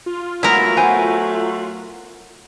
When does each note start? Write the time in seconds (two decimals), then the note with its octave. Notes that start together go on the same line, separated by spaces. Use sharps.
0.06 F4
0.43 F#3 G#3 A3 B3 E4 A#4
0.77 B3 C5 G#5